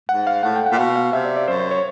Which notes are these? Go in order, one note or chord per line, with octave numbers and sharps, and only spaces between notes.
G#2 F#5
F5
A2 F#5
G5
F#5
A#2
B2 F5
F5
C3 E5
D5
D5
F#2 C5
C5
C#5